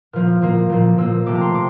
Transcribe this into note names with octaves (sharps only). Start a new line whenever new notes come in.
A#2 F3 A#3 F6
A#2 F3 A#3
A#2 F3 A#3
A#2 F3 A#3 E6
C3 F3 A3 D6
A#5
C6
C3 D6